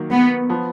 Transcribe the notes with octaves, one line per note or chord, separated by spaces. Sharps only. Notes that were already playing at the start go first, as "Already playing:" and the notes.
Already playing: D#3 F#3 A#3
B3
F3 B3